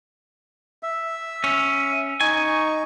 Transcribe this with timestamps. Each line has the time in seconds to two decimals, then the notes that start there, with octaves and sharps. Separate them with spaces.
0.83 E5
1.44 C#4
2.21 D#4 G#5 C#6